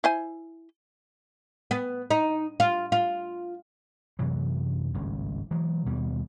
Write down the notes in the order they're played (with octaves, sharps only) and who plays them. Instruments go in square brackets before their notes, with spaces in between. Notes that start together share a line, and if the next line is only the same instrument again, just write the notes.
[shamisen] E4 C5 G#5
[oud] B3
D#4
F4
F4
[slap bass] F#2 C3 E3 F#3
G#1 C#2 G2
E3 F#3 G#3
D#2 B2 G3